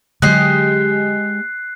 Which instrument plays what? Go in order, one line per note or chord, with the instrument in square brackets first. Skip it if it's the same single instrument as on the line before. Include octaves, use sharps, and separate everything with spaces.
[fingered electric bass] D3 F#3 [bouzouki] G#3 G4 D#5 [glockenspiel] F#6 C7